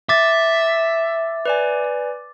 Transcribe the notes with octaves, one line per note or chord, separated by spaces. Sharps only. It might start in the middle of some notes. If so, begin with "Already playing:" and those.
E5 D6 A6
B4 D5 G#5